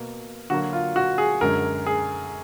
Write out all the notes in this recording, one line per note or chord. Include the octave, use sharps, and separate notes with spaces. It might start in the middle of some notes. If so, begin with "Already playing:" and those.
Already playing: B2 A#3
D3 F#3 A#3 F#4
F4
F#4
G#4
F#2 D3 G#3 A#4
G#4